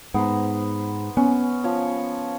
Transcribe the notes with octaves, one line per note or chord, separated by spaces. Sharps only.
G#2 B3 C5 A#5
B3 C#4
F3 C#5